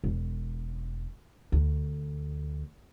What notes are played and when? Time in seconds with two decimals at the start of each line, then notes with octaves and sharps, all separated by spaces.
0.04 E1
1.52 D2